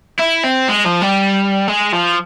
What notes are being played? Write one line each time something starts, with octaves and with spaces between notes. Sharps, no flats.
E4
C4
G#3
F3
G3
G#3
F3